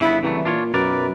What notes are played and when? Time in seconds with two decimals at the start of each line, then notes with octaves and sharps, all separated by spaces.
0.01 G1 C#3 B3 E4
0.23 C2 C#3 E3 F#3 A3
0.45 A#2 D4 F4 C#5
0.74 B1 F#2 A#4 B4 D5